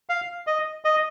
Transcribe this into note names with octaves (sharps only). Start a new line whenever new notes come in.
F5
D#5
D#5